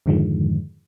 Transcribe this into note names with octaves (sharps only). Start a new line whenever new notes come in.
F2 G#2 D3 D#3 F3 G#3